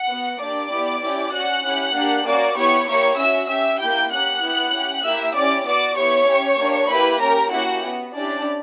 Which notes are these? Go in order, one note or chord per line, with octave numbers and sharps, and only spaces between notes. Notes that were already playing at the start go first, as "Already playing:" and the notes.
Already playing: F#5
B3 F#4
A#3 D4 G4 D5 D6
B3 E4 G4
C#4 E4 G4
C#4 F#4 F#5 F#6
C#4 E4 G4
A#3 D4 G4
A#3 C#4 F#4 D5 D6
B3 E4 G4 C#5 C#6
A#3 E4 G4 C#5 C#6
C#4 F#4 E5 E6
C#4 G4 E5 E6
A#3 E4 G4 G5 G6
A#3 C#4 G4 F#5 F#6
B3 E4 G4
C#4 G4
A#3 E4 G4 E5 E6
C#4 E4 G4 D5 D6
B3 F#4 D5 D6
B3 E4 G4 C#5 C#6
C#4 G4
A#3 D4 G4
A#3 E4 G4 B4 B5
C#4 G4 A#4 A#5
A#3 C#4 E4 F#4 G4 F#5
B3 F#4
C#4 D4 E4 G4 D5